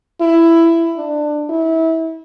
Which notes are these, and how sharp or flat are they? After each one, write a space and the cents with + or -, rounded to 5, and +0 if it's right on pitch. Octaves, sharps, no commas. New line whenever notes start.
E4 +10
D4 +20
E4 -30